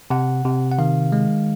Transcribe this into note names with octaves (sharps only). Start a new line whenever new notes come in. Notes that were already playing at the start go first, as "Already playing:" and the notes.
C3 F#5
C3
F#5
D#3 F5
G#3